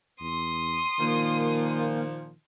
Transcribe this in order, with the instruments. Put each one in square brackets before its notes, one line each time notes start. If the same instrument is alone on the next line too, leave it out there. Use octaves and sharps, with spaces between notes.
[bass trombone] E2 [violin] C6 D#6
[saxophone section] A#2 F3 [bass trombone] D#3 [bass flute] A#3